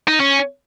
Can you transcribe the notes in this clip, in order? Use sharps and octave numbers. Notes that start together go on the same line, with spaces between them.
D#4
C#4